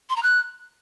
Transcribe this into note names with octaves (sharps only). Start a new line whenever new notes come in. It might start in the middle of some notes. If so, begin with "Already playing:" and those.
C6
A#5
F#6